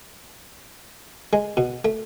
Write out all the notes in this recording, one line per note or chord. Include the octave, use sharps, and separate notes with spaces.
G#3
B2
A3